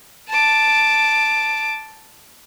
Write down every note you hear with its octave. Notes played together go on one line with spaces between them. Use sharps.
A5 D6